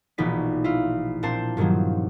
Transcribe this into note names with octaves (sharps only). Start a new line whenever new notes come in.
A#1 B2 E3 D#4 D5 B6
E4 F4 F5
A#2 C4 D4 C5 A5 C6
G2 A#2 D#3 F3 F#3